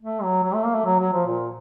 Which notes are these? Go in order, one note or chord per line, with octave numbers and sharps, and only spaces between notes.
A3
F#3
F#3
A3
A#3
A3
F#3
F#3
F3
A#2